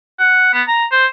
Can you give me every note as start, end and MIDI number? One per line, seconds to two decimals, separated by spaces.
0.19 0.51 78
0.54 0.62 59
0.68 0.85 82
0.92 1.06 72